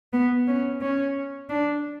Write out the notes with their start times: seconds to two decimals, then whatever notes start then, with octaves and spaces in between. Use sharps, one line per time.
0.13 B3
0.47 C#4
0.81 C#4
1.49 D4